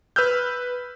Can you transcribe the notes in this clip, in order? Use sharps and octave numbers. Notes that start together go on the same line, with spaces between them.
B4 E6 F6 G6